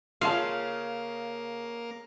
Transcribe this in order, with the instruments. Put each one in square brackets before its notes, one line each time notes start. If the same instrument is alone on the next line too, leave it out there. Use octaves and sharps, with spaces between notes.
[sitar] C#3 [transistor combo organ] A#3 [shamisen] F4 E5 A5 [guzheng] F5